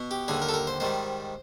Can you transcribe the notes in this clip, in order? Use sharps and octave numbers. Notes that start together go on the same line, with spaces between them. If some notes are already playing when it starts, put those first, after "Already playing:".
Already playing: B2 B3
G4
D#2 D3 G3 G#4
A#4
A4
A#4
C5
G#2 D#3 G3 C5